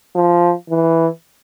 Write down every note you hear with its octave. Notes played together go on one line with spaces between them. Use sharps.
F3
E3